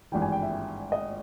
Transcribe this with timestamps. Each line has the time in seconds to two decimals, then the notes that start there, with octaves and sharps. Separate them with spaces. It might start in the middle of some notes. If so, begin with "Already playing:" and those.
0.12 G#1 G2 E3 G5
0.22 G#5
0.32 G5
0.42 E5
0.92 D#5